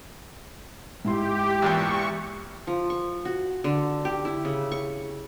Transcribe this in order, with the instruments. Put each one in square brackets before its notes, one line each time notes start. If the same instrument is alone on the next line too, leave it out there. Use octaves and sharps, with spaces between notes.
[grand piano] G#2 E4 C6 [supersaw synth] G4
[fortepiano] E2 A#2 E3 [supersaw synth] C#6
[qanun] F3
C#6
F#4
D3
G4
E4
C#3
C#6